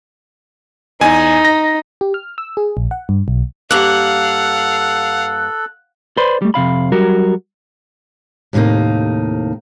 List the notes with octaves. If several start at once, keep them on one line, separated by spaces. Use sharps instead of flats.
E2 D#4 G#5
A#6
G4
F6
E6
G#4
A#1
F#5
G2
B1
G2 A#3 A4 F5 F#5 F#6
B4 C5 D5 B5 C6
G3 A3
F2 C3 F5 B5
F#3 G3 F#4 A#4
D#2 A2 C3 A#3 D#4